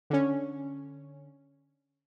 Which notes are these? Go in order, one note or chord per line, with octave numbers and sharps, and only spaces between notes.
D3 C#4